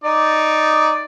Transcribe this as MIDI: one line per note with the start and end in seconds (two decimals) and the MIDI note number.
0.04 1.05 63
0.04 1.05 74